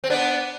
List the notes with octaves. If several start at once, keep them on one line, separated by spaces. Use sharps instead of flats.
C4
B3 D4